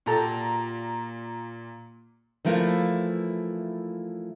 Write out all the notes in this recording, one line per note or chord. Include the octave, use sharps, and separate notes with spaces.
A#2 F#4 G4 A4 A#5
E3 F3 A3 A#3 E4